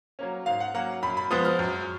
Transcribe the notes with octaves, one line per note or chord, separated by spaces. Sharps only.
F#3 A#3 C#4
G#2 F5
F#5
F#3 A#3 C#4 F#5
F#2 B5
B5
F3 G#3 B3 D#6
F6
F#2